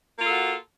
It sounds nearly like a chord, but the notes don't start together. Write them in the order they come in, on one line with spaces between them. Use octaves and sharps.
A#3 F4 A4 F#4